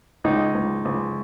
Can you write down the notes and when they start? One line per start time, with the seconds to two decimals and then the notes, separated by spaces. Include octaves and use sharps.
0.24 C#2 D#4
0.54 C#2
0.85 C#2